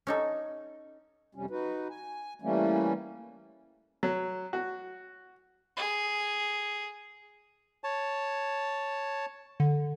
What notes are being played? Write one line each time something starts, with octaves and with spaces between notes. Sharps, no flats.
C#4 D#4 A4
F2 C3 G3 C#4
D#4 F#4 B4
G#5
E3 G3 A3 A#3 C#4
F#3
F#4
G#4
C#5 A5
D3